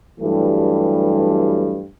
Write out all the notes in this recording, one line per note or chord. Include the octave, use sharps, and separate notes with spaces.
G2 E3 F#3 G3 A3